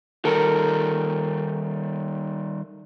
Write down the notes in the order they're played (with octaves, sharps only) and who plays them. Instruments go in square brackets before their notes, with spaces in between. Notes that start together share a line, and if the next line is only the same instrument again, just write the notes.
[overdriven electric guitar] D#3 G3 [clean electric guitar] A4 A#4